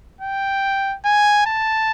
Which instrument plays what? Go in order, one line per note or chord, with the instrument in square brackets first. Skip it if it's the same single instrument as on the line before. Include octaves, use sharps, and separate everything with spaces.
[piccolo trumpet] G5
G#5
A5